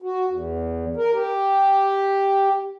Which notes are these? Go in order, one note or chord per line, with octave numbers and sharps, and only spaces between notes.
F#4
E2
A#4
G4